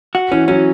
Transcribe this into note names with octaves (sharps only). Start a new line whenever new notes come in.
F#4
E3 C#4
F#3 C#4